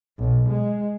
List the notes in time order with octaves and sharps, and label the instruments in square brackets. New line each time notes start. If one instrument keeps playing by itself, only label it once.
[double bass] B1
G#3